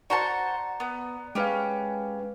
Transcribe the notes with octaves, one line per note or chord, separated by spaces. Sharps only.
F#4 C5 D5 A5 A#5 C#7
B3
G#3 C#4 G4 B4 F5